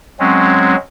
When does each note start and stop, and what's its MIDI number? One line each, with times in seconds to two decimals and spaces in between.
0.20 0.76 54
0.20 0.76 56
0.20 0.76 60
0.20 0.76 61